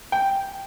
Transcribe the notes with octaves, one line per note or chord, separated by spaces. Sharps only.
G5